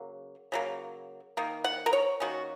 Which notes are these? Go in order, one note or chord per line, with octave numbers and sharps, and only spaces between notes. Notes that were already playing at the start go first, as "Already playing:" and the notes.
Already playing: C#3 F#3 A#3
C#3 F#3 A#3
D#3 A#3
F#5
A#4
C#5
D#3 A#3 C#4 F#4